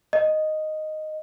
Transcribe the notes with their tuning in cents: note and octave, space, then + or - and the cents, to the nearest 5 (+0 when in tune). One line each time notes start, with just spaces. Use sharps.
D#5 -5